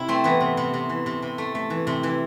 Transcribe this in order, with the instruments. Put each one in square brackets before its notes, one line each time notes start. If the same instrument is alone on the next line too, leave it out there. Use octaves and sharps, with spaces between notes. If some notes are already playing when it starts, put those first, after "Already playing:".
Already playing: [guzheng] C3 E4
A3 C4
E3 B3
C3
C3
C3
E3
C3
C3
A3
A3
E3
C3
E3